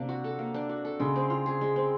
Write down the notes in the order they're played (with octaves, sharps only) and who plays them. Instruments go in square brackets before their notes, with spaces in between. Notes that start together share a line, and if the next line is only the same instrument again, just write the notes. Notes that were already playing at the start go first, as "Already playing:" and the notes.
Already playing: [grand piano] C3 [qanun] A#3 D4
[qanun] F#4
A4
A#3
D4
F#4
A4
[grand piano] C#3 [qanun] G#3
[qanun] C4
F4
G#4
G#3
C4